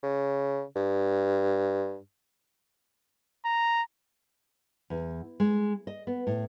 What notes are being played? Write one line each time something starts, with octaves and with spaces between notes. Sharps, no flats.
C#3
G2
A#5
E2
G#3
D#5
B3
A2